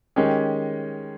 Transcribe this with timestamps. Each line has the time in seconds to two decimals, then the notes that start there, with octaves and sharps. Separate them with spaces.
0.16 D#3 G#3 C#4 G4